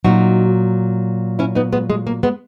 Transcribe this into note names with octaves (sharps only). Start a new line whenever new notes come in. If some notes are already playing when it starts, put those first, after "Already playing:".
A#2 F#3 D#4 F#4
C#4 E4
B3 D#4
G#3 B3
G#3
A#3
G#3 B3